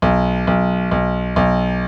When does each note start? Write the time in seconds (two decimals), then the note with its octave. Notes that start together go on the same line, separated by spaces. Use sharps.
0.02 B1
0.47 B1
0.91 B1
1.36 B1